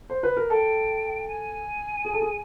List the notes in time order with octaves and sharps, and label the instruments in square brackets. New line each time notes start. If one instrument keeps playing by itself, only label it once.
[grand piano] C5
B4
A#4
[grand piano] A4 [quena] G5
[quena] G#5
[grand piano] G#4
A4
G#4